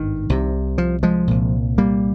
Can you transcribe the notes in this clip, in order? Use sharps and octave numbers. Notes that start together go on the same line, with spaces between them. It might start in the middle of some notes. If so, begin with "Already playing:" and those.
Already playing: G#1 G2 D#3
C2 C3
F3
F3 G#3
C2 A#2
G3 A#3